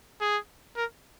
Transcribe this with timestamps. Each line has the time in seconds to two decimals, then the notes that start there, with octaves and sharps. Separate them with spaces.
0.21 G#4
0.76 A#4